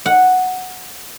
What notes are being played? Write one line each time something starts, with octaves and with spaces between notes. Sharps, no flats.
F#5